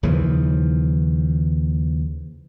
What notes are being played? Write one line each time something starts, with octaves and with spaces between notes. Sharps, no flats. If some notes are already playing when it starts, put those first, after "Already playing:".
D#2 C#3 E3 F3